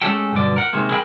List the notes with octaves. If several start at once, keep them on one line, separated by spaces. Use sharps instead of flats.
G#3 A3 C#4 G4 A4 G5
B1 G2 B2 D3 D5
A#4 F#5
C3 D#3 G#3 A#3
E4 G#4 A#4 E5 G5 B5